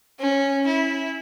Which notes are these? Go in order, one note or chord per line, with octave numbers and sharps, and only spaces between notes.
C#4
E4